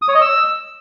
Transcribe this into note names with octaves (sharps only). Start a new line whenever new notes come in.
D#6
C#5
D#5
E6